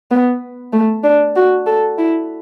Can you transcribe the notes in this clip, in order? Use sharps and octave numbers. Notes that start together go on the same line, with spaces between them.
B3
A3
D4
F#4
A4
E4